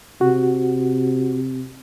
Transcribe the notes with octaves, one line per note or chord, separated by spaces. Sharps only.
C3 F#4